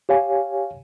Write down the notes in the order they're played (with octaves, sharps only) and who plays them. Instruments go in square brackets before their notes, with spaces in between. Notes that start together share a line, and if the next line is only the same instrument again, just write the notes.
[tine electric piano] G4 C#5 F5 G#5